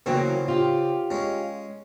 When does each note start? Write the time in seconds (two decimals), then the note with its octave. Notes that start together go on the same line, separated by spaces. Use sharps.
0.06 C#3 E3 F#3 A#3 C4
0.48 F4 G4
1.10 G#3 C#4